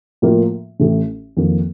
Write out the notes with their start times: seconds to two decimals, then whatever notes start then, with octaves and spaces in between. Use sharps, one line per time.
0.22 A2 F3 A#3 F4 A#4
0.80 A1 A2 A3
1.37 F2 D#3 A#3